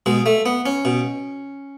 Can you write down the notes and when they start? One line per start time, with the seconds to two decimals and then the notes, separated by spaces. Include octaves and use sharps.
0.06 B2 G#3
0.26 A3
0.46 B3
0.66 C#4
0.85 B2